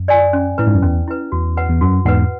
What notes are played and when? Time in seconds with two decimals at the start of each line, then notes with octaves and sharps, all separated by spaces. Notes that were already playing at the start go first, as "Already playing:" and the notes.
Already playing: F#2
0.08 D5 G#5
0.33 C#4
0.58 A2 E4 B4
0.67 G#2
0.75 F#2
0.82 E2 C#4
1.08 E4 B4
1.32 E2 F#4
1.57 B4 F#5
1.70 E2
1.81 F#2 F#4
2.05 E2 G#2 B4 F#5